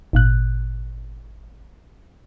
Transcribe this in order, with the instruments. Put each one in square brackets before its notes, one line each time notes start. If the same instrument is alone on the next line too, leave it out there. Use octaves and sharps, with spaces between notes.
[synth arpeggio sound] G#1 A#2 F#6